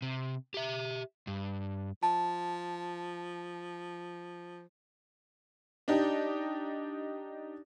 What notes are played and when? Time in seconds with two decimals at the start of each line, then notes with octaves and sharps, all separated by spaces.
0.02 C3
0.54 G4 E5
1.27 G2
2.03 F3 A5
5.88 D4 D#4 G4